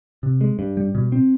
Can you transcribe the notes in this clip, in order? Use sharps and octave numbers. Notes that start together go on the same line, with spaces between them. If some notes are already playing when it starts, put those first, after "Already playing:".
C3
G#3
G2
G3
B2
C4